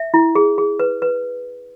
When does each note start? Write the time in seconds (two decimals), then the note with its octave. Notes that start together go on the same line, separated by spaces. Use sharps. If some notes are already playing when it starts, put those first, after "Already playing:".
Already playing: E5
0.14 E4
0.35 G#4
0.58 G#4
0.79 B4
1.02 B4